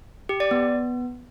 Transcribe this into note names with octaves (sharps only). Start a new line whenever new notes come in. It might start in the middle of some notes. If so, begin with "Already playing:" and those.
G4
D5
B3